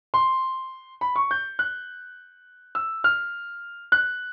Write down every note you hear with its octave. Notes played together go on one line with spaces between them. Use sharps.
C6
B5
C#6
G6
F#6
E6
F6
F#6